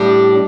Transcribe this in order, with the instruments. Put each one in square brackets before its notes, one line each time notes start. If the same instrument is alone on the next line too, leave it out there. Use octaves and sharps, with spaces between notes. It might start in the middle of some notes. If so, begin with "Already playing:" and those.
Already playing: [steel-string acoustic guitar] A2 G3 D4